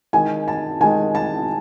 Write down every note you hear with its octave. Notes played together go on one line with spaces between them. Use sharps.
D#3 G#3 G#5
A5
D#3 G#3 G#5
A5